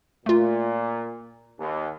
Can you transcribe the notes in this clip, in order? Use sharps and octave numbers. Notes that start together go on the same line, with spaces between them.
A#2 A3 F4
D#2